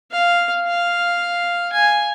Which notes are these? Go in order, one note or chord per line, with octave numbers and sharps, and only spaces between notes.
F5
F5
G#5